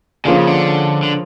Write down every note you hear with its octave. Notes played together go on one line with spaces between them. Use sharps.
D3 F3 A#3 C#4 F4 G#4
C#3
D3
D3